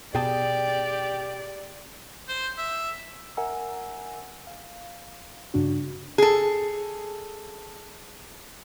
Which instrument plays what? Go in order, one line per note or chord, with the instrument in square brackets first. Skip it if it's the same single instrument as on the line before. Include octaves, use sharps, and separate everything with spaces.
[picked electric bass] B2 [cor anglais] G4 [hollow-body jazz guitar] G#4 G5 A5 [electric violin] D5
[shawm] C5
E5
[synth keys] A#4 E5 F#5 G#5 A#5 E6
F5
G2 C#3 D4 F#4
[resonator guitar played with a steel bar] G#4 A4